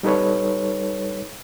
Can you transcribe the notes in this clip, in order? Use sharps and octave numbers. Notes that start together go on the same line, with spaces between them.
G3 D#4 A4 B4 C#5